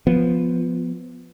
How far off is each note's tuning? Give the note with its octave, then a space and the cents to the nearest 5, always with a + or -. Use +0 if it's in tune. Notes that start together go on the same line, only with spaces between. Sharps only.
F3 +0 B3 +0